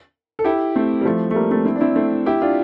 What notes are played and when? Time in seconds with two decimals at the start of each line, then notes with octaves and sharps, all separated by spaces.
0.39 A4
0.44 E4 G4
0.76 A3 C4
1.01 G3
1.05 F3 A3
1.31 A3
1.35 G3 A#3
1.51 A3 C4
1.65 C4 E4
1.76 D4
1.81 C4 E4
1.95 A3 C4
2.26 E4 G4
2.42 D4 F4